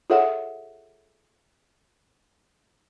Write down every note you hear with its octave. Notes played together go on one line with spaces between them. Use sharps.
F4 G#4 A4 C#5 E5 F#5